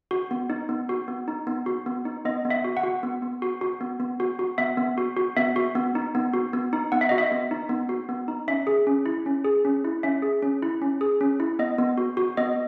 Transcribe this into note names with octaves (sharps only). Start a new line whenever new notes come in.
F#4
B3
D#4
B3
F#4
B3
D#4
B3
F#4
B3
D#4
B3 D#5
B3
E5
F#4
F#5
F#4
B3
B3
F#4
F#4
B3
B3
F#4
F#4
B3 E5
B3
F#4
F#4
B3 E5
F#4
B3
D#4
B3
F#4
B3
D#4
B3 F#5
E5
F#4 D#5
E5
B3
D#4
B3
F#4
B3
D#4
C#4 E5
G#4
C#4
E4
C#4
G#4
C#4
E4
C#4 E5
G#4
C#4
E4
C#4
G#4
C#4
E4
B3 D#5
B3
F#4
F#4
B3 D#5